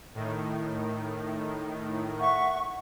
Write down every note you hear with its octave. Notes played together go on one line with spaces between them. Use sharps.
A2 D#3
E5 F#5 C#6